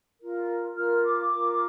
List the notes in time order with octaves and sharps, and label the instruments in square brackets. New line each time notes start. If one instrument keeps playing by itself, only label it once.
[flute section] F4 A#4
F4 A#4 F6
D6
F4 A#4